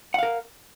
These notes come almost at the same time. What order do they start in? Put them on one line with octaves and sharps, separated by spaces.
F#5 F5 A#4